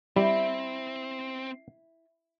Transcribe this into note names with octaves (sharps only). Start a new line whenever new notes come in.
G3 C4 E4